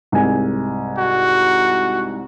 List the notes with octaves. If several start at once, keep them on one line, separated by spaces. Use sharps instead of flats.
C2 G#2 G#5
F#4